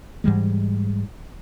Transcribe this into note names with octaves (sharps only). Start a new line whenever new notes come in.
G#2 E3 G3 G#3